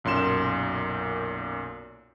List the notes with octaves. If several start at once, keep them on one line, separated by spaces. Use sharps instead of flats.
B1 F#2 A#2 C6 E7